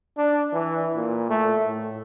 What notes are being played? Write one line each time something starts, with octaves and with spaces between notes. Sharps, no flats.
D4
E3
A#2
A3
A2